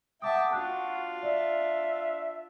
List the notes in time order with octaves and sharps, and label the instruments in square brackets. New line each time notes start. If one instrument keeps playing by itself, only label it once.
[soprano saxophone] E5 [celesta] F#5 D6 D#6 [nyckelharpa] G5 A5
[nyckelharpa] D4 F4 [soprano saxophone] F#4 [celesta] F#6
[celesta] D5 [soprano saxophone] E5